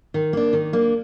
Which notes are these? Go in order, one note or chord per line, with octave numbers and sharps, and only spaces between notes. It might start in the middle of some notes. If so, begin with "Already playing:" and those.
D#3
A#3 D4
D#3
A#3 D4